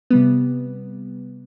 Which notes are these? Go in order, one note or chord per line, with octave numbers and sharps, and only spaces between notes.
C3 G3 B3